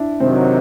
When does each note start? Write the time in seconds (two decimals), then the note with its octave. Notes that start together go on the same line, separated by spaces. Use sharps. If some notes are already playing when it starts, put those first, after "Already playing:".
Already playing: D4 E4
0.20 C3 D#3 F#3 C4